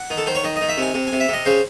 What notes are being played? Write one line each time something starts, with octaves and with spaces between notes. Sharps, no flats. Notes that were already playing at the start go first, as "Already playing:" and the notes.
Already playing: F#5
D#3
A4
D#3 C5
C#5
D#3 D#5
D#5
D#3
E5
C3 G#5
C3
G#5
C3
E5
C3 D#5
C#3 C5